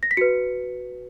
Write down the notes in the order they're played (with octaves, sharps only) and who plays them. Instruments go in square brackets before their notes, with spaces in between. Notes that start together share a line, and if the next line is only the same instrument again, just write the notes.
[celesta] A#6
B6
F#4 B4 C#7